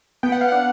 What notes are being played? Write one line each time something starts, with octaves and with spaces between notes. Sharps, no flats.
B3 G5
F#5
F5
D4 F#5